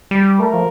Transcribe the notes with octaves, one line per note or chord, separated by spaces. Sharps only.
G3
A3 A#4
F3